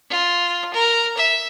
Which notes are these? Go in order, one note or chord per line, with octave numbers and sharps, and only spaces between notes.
F4
A#4
E5